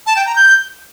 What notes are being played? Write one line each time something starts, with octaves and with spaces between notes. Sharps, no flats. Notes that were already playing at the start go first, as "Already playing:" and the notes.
A5
G5
A#5
G6